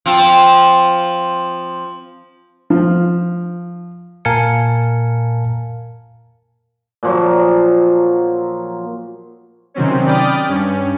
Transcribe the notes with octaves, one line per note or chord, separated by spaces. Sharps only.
F3 C4 F4
F3
A#2 A#4 F5 G#5 A5 C#7
A#2 F3 F#3
C3 D#3 F#3 C4 C#4
D5 G5 B5 D6 D#6 F6
G2 C#4